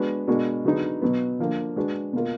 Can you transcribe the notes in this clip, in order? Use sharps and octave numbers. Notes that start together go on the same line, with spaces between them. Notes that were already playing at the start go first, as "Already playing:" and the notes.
Already playing: G#3 B3 D4 F#4 B4
B2 G#3 D4 F#4 A#4
D3 F#3 B3 D#4 G#4
B2 F#3 B3
D3 F3 A#3
G#3 D4 F#4 B4
B2 A#3 F4 A#4